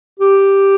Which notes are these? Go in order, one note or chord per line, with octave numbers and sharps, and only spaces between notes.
G4